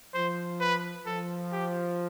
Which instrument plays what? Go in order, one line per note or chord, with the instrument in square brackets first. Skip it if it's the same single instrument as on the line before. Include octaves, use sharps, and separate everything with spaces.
[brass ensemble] F3 [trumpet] C5
[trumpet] B4
[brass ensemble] F3 [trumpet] A4
[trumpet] G4